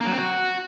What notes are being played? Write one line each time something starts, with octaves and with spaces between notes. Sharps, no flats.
A#3
F#3
C4
F#4